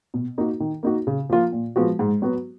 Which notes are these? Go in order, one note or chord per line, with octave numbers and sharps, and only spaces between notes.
B2
A#3 D#4 F#4
D#3
A#3 D#4 F#4
C#3
F3 A#3 F4
A#2
F3 G#3 B3 F#4
G#2
F#3 B3 F#4